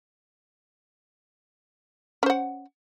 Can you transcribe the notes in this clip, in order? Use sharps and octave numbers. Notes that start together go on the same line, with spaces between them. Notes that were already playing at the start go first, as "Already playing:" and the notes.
C#4 C5 F#5